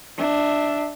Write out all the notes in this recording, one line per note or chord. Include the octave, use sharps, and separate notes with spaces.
D4 E5